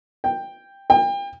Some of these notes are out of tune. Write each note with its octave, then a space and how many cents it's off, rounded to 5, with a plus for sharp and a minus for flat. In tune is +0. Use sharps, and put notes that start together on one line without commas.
G5 +5
G5 +35